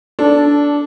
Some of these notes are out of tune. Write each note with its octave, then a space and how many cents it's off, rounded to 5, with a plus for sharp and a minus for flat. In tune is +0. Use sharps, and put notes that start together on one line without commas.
D4 -15 A4 +0